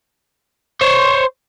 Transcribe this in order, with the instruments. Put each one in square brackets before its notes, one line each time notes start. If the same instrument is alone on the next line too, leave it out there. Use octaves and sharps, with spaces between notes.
[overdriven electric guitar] C5 C#5